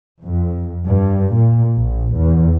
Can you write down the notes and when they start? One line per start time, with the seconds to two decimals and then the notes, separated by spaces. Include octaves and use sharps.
0.24 F2
0.87 G2
1.34 A#2
1.77 A#1
2.18 E2